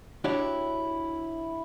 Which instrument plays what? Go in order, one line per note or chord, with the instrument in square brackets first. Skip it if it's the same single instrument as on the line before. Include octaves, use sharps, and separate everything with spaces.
[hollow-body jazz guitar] D4 E4 F#4 G4 C#5 D5